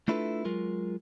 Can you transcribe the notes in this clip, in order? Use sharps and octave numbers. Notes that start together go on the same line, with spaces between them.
A3 D4 E4 F4 A4 B4
F#3 G#3 F4 A#4